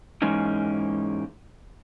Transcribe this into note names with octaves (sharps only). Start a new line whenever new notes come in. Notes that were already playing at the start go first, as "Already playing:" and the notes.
G#2 E3 G#3 A#3 C#4 D#4